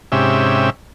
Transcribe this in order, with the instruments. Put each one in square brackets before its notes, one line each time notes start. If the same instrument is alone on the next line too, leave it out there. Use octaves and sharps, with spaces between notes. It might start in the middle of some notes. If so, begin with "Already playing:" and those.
[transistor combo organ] G#2 C3 C#4 G4 E5